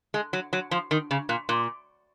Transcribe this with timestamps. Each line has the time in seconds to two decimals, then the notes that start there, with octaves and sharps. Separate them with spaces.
0.14 G#3
0.33 F#3
0.53 F#3
0.71 F3
0.91 D#3
1.11 C#3
1.29 A#2
1.49 A#2